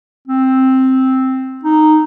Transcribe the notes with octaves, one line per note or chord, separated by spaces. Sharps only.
C4
D#4